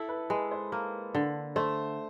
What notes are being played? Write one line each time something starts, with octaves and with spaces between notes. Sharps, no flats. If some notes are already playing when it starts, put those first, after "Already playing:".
Already playing: E4 A4
B4
G#3 B4
C5
A#3
D3
A3 C5